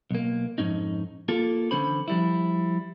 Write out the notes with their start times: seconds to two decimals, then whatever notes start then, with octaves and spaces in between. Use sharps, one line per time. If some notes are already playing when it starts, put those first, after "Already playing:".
0.11 B1 A#3
0.58 F2 G#2 C#4 D#4
1.28 A#3 F4 A4
1.71 D3 E3 C#4 C5 B5
2.08 F3 G3 E4